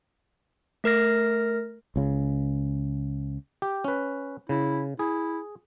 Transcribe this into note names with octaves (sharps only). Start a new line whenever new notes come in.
A3 A#4 F6 A#6
C#2 C#3
G4
C#4 B4
C#3 E4
E4 G#4